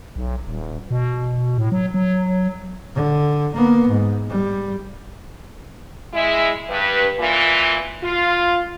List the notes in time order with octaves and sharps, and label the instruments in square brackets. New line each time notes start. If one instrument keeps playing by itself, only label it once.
[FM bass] B1
D#1
B2
A2
F#3
F#3
[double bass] D3
A#3 B3
G#2
G3
[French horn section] G#3 E4
G2 B4
A#2 E3
F4